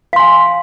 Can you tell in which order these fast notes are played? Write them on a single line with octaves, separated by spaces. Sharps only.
F5 C6 G#5